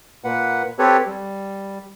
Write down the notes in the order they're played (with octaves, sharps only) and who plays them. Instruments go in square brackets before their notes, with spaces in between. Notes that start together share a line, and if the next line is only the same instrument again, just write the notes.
[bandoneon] A#2 A#3 B4 F#5
C4 G4 A4 B4 C#5
G3